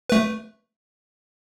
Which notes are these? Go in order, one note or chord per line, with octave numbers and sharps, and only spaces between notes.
A3 B4